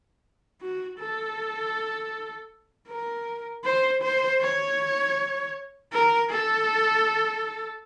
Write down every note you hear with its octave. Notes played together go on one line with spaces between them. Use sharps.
F#4
A4
A#4
C5
C5
C#5
A#4
A4